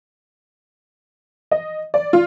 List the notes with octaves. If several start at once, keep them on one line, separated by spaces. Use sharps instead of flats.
D#5
D5
F4